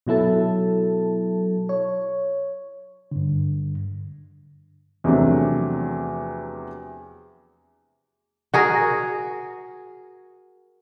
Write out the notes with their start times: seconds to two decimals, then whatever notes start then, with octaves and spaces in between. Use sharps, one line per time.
0.07 B2 F#3 E4 A4 A5
1.69 C#5
3.11 G2 D3
5.04 E2 C3 F3 F#3 A3 D4
8.54 F#4 G#4 A#4